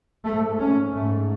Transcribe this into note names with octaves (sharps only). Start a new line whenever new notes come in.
G#2 A3
C#4
G#2 A3